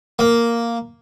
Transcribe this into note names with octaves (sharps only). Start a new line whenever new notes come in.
A#3